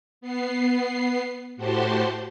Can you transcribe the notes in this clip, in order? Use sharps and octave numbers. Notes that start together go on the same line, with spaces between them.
B3 C7
A2 F#4 G4 C5 A5 C6